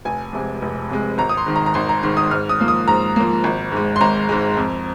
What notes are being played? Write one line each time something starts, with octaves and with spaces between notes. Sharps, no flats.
F1 G#5
F2 C3 G#3
F1
F2 C3 G#3
G#1 A#5
D#6
C6
G#2 D#3
A#5
A#5
G#1 C6
A#5
G#2 D#3 C6
D#6
G#2 F6
D#6
F3 A#3
D#6
G#2 A#5
F3 A#3
G#1
G#2 G#3
C6
G#1 A#5
G#2 G#3
F2